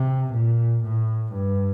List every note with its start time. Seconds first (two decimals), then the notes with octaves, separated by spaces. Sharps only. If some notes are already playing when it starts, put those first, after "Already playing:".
Already playing: C3
0.33 A#2
0.84 A2
1.33 G2